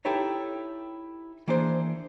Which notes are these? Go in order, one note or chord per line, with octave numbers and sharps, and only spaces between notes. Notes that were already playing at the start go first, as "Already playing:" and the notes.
D#4 E4 G4 A4 B4 C#5
E3 A#3 D4 G#4 C5